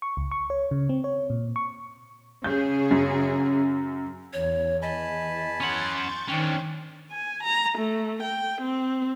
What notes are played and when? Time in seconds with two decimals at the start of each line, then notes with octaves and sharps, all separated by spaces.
0.02 C#6
0.17 C#2
0.31 C#6
0.50 C#5
0.71 C#3
0.89 C4
1.04 C#5
1.30 A#2
1.56 C#6
2.44 C#3 G#4 G6
2.91 F#2
4.33 E2 C#5
4.82 D#5 G#5 A5 B5
5.61 C#4 F#5 C6 C#6 G6 A6
6.29 D#3 C#4 D4 C5 G5
7.11 G#5
7.43 A#5
7.78 A3
8.22 G5
8.61 C4